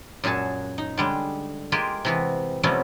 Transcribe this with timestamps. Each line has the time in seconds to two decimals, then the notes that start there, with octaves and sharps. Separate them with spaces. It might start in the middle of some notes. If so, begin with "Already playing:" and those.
0.24 F#2 A#2 F#4 G#4 A5
0.78 D#4
0.97 D3 G3 G#3
1.72 G#3 A#3 F4 G4 G#4
2.05 C3 E3 B3
2.63 C3 F3 G3 A3 B3 C#4